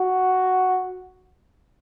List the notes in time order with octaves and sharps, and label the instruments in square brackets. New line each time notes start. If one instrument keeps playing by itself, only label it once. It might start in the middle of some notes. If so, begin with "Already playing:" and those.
Already playing: [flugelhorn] F#4